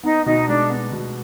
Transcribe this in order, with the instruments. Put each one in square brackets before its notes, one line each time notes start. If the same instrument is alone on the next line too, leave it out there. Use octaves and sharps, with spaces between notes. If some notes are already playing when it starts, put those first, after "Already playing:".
[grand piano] B3 [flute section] D#4
[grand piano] B2 [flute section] D#4
[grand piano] G#3 [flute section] D4
[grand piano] B3
B2